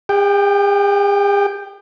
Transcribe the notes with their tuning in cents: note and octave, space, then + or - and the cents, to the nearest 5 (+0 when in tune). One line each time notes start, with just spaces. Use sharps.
G#4 -45 G5 +0